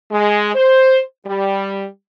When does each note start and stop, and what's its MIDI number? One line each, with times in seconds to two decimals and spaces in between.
0.11 0.51 56
0.55 1.01 72
1.26 1.85 55